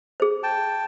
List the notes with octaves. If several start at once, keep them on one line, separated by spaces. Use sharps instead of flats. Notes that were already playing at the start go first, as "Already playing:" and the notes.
G#4 C5
G5 A5